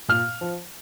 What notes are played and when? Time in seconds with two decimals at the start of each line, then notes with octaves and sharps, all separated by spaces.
0.09 A#2 F6
0.41 F3